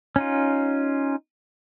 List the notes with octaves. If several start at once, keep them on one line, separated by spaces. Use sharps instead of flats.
C#4 D#4 F4